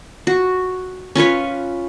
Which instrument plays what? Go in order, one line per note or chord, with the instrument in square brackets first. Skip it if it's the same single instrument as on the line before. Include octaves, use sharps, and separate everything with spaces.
[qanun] F#4
C#4 F4 B4 C#5